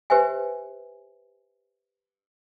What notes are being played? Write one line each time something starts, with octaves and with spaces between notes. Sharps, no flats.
G4 B4 C5 E5 G#5